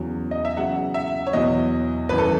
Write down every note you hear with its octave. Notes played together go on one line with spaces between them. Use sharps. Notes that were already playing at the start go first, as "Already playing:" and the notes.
Already playing: E2 C#3 F#3
D#5
E5
E2 C#3 F#3 F#5
E5
C#5
E2 B2 F#3 D#5
G#1 F#2 E3 B4
A4